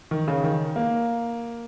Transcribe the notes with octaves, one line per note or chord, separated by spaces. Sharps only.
D#3
C#3
D#3
A#3